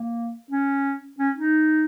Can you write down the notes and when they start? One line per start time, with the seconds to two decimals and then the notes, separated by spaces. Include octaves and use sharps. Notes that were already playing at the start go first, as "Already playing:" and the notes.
Already playing: A#3
0.51 C#4
1.19 C#4
1.36 D#4